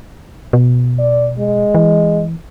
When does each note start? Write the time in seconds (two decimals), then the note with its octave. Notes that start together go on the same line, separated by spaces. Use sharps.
0.53 B2
0.99 D5
1.39 G#3
1.75 E3